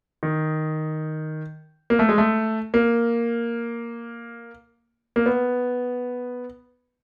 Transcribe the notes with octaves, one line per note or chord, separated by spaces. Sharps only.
D#3
A#3
A3
G#3
A3
A#3
A#3
B3